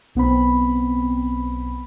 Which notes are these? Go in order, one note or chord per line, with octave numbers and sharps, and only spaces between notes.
B1 B3 C4 B5